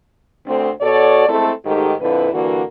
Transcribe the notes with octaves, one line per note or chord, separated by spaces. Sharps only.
D2 C4
B2 F#4 A4 C#5 D5
G#3 A3 C4 E4 A4
G#2 D#3 A3 G4
F2 A#2 D3 E4 B4
G2 D3 E3 A#3 F#4